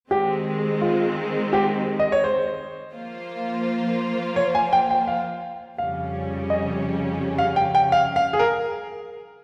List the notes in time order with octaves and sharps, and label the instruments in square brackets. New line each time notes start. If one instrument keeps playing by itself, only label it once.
[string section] D#3 G#3 C4 [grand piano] G4
[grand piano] F4
G4
D#5
C#5
C5
[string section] F3 A#3 F4 C5
[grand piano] C#5
G#5
G5
G5
F5
[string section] F2 C#3 G3 C#4 [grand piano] F5
[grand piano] D#5
F5
G5
G5
F5
F5
G#4
A#4